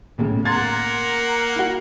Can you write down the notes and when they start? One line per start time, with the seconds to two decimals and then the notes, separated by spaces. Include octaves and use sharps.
0.18 B1 A2 C#3
0.45 A#3 A#4 F#5 C6 G#6 A6
1.56 E4 F#4